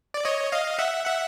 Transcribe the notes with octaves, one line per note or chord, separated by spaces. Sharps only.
D5
C#5 D#5
D#5 F5
E5 F#5
E5 F#5